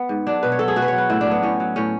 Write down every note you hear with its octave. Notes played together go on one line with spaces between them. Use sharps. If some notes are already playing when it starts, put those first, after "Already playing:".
Already playing: B3
G#2
F#3 D4
B2 B4
C#5
F#3 A4
G#4
B2 F#4
B4
F#3 C#5
B4
A2 E4
D4
F#3
B3
A2 C#4
F#3
A2 C#4